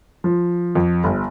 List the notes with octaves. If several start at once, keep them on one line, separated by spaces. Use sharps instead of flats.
F3
F2
G1